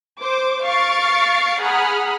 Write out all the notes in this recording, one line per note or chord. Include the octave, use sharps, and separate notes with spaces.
C5 D6
F5 C#6 F6 A6 C7 D7
G#4 F#5 A#5 B5 D#6 F6